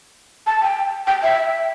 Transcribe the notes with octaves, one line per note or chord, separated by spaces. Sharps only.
A5
G5
G5
E5